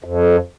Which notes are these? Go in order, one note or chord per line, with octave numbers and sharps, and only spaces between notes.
F2